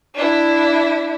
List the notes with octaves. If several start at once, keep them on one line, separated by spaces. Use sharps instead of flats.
D4 E4